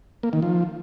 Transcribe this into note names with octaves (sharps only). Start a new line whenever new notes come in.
A#3
D#3
F3